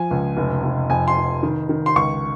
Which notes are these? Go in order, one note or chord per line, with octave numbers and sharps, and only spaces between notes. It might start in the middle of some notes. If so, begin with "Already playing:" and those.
Already playing: F3 G#5
C#2
F1
F1
F2 G#5
C6
F1
D#3
D#3
C6
C#2 C#6